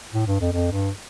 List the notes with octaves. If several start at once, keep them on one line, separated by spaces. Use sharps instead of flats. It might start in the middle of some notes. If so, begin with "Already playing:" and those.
A2
G2
F2
F2
G2